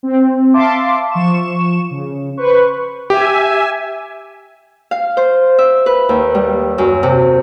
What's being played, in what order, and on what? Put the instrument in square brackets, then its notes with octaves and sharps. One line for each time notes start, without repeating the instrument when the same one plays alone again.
[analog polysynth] C4
E5 F5 A5 C6 D6
F3 C#6 E7
C#3
B4 C5 C#6
[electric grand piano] G4 [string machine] E5 G#5
[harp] F5
C5
E5
B4
D#2
G3
F#2
C3